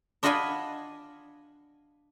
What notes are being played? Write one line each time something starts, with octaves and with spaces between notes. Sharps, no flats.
D4 F4 D#5 F#5 G#5 B5